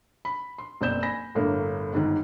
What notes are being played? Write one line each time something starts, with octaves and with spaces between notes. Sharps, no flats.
B5
C6
F#1 B2 C4 D5 G6 E7
G#5 B5 A#6
G1 A2 D3 A#3
G1 G#2 D#3